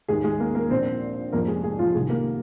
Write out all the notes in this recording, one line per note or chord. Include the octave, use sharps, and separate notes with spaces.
D#2 D#3 G#3 G#4
G#3 G#4
A#3 A#4
A#3 A#4
A#1 A#2 F3 C4 C5
F1 F2 C3 A#3 A#4
G#3 G#4
G#3 G#4
F3 F4
C2 C3 D#3 G#3 G#4
A#3 A#4